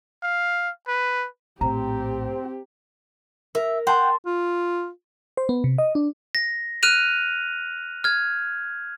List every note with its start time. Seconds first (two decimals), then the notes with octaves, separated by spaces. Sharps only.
0.23 F5
0.88 B4
1.61 A#1 A2 C4 G4 A#5
3.55 A#4 E5
3.87 F#5 G5 A5 C6
4.26 F4
5.37 C5
5.49 B3
5.64 C3
5.78 D#5
5.95 D4
6.35 A#6
6.83 F6 F#6 D#7 F7
8.04 F6 G#6